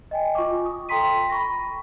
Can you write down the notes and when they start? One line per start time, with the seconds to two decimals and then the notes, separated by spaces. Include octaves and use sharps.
0.11 D#5 G5 G#5
0.35 F4 C#6 D6
0.65 D#6
0.89 A4 G5 A#5 C6 B6 D#7
1.29 B5 C#6 A#6